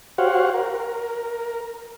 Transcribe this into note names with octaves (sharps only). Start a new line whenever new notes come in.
F#4 G4 C5 C#5 F5 F#5
A#4